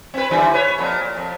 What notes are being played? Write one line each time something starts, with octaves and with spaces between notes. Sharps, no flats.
C4 B4
D3 E3 G3
B4 C#5
F2 A#2
A#2
F2